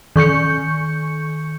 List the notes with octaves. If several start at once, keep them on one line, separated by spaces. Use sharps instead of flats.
D#3 C#6 G6 C#7